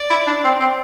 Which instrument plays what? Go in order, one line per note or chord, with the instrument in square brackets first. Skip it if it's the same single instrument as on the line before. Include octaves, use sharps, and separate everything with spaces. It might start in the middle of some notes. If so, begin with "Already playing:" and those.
Already playing: [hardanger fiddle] D5
[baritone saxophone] E4
D4
C4
C4